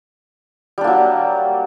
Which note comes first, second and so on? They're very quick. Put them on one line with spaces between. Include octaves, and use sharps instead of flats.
G3 D4 A#3 F#3